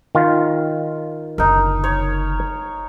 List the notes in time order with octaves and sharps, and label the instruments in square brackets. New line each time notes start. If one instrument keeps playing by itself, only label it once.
[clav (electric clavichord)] D#3 F4
[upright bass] F#1 D3 [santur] D#4 A#4
[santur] C#5